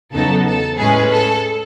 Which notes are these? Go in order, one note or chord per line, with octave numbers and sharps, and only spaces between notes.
E2 C#3 F#3 B3 D#4 A4
A4
A2 G#3 C#4 G#4 B4
A4